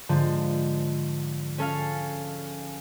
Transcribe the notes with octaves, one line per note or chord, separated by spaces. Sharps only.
G#2 D3 F3
C#4 A4 F5